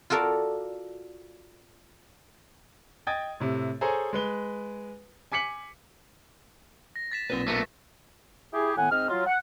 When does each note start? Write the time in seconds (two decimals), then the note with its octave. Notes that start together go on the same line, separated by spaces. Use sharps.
0.10 F4 F#4 A4 A#4 D5
3.07 D#5 G5 D#6 G#6 A6
3.40 A2 C3
3.81 G#4 A4 C5 C#5 G#5 A#5
4.13 G#3 B4 G7
5.32 G#5 D6 B6 C#7 F#7
6.96 A#6
7.12 A6 B6 E7
7.30 B1 A#2 C4 B4
7.48 A3 B3 A#4 B4
8.53 E4 G4 G#4
8.77 A2 D#3 B3 F#5 G#5
8.91 G#2 C4 D#5 F6
9.10 F#3 F4
9.26 F#5